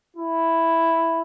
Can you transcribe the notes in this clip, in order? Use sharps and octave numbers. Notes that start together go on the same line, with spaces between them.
E4